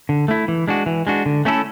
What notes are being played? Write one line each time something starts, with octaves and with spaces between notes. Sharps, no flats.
D3
A3 E4
E3
G#3 D4 F#4
E3
G#3 D4 F#4
D3
A3 C#4 E4 A4